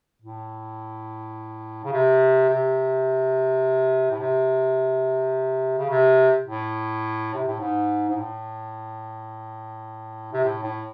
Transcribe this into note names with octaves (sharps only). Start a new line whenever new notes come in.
A2
C#3
C3
C3
A2
C3
C#3
C3
A2
C3
A2
G#2
G#2
A2
C3
A2
A2